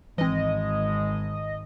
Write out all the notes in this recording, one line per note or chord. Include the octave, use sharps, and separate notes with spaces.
G#1 E3 G#3 C4 D#5